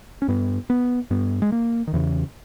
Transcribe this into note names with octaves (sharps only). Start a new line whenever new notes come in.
C#4
G2 B3
B3
G2 B3
G#3
A#3
D#3
E2 C#3 E3